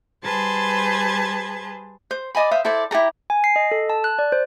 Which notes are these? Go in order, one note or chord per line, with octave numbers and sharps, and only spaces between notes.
G3 G#4 B4 C5 A5 G#6
C5
D5 D#5 G#5 B5
C5 E5 F5 D#6
E4 A4 C5 D5
E4 G4 A4 A#5
G#5
C7
D#5
A4
A5
F#6
D5
C5